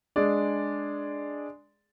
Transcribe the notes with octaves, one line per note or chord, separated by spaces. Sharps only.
G#3 D4 G#4 D5